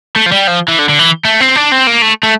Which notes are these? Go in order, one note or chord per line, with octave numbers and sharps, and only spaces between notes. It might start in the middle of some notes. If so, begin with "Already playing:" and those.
A3
F3
G3
F3
E3
D3
D3
E3
A3
C4
D4
C4
A#3
A3
A3